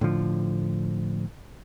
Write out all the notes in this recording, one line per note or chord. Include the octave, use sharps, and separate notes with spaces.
A2 D3 F3